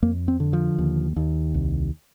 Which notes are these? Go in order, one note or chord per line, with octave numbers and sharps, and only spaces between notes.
F2 A#3
C4
D3
F3
D#2
D#2
C2